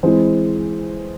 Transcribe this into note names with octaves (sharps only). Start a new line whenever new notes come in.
E3 G#3 C4 E4 C5